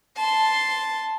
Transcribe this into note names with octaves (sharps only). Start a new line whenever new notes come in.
A5 C6